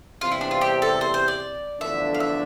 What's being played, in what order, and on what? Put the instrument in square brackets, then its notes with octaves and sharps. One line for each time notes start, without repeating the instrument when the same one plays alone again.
[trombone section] E2 C3 G3 C4 [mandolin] F4
[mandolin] E4
D4
F4
G4
A4
C5
C5
D5
[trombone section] E2 D3 F3 A3 D4 [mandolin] E5
[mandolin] F5
E5